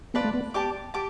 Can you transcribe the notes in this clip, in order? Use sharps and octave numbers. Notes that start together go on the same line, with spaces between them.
B3 F4 B4 D5 A5
A3
B3
G4 D5 A5 D6
G4 A5 D6